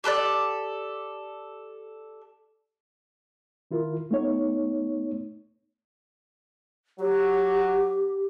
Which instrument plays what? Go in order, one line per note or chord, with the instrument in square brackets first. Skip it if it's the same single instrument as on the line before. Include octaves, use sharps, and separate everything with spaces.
[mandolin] G4 A4 B4 D5
[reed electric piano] D#3 E4 F4 A#4
A3 B3 D#4 C#5
[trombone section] F#3 [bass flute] G4